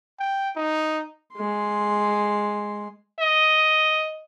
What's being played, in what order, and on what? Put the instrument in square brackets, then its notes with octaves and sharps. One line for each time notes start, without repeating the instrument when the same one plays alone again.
[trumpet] G5
D#4
[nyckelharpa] G#3 C6
[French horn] D#5